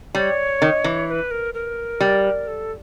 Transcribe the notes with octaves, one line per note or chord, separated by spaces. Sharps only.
G3 C#5
D#3
E3
C#5
B4
A#4
A#4
G3
A4